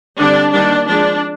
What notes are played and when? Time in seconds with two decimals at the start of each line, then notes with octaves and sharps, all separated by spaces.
0.19 D3 G3 C4 D4
0.53 D#3 G3 A#3 D4
0.88 F3 G#3 C4 D4